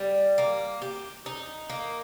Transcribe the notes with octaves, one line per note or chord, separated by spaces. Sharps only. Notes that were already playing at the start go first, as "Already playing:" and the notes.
Already playing: G3
A#3
G4
D#4
A#3